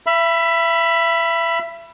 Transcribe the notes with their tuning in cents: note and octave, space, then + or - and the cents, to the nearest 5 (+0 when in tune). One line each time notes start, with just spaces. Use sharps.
E5 +30 B5 +0